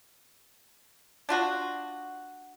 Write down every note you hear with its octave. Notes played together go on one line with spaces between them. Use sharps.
D4 F4 F#4